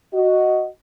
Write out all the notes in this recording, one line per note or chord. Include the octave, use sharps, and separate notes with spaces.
F#4 D#5